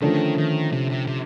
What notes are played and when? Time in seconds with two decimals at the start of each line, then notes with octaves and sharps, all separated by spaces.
0.01 D3 D#3 F3 A3 C#4
0.37 D#3
0.72 C3
0.90 C3
1.07 C3